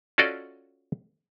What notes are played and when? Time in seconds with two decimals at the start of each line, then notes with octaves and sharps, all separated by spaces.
0.18 C#4 F4 F#4 A4 D5 D#5